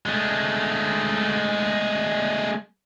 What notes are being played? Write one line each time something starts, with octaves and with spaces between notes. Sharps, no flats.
G#3 A3